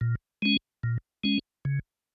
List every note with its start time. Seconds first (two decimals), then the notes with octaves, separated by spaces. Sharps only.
0.01 A#2
0.42 G#3 C#4
0.83 A#2
1.24 G#3 C#4
1.65 C#3